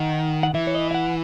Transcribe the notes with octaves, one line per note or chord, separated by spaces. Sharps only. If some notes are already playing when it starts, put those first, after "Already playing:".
Already playing: D#3 F#5
F#5
E3 E5
C#5
D#5
E5
F#5